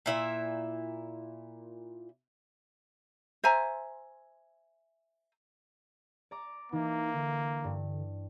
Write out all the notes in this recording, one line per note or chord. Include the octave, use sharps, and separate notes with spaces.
A#2 E4 E5
C5 E5 G#5 A#5
D5 A#5 D6
E3 A#3 D#4
D3
G2